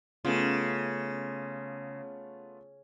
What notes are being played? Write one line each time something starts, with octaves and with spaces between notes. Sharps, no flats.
C#3 A3 B3 F4